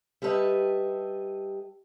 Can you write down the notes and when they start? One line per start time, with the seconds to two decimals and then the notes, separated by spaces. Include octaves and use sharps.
0.22 G3 G4 A4 B4 D#5 E5